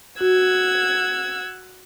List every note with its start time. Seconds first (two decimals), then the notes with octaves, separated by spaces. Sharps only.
0.21 F#4 F#5 E6 G#6